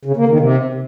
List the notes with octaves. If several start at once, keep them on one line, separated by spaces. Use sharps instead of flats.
C#3
A#3
D#3
C3